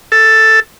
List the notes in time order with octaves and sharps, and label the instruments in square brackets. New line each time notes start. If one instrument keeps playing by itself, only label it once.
[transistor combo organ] A4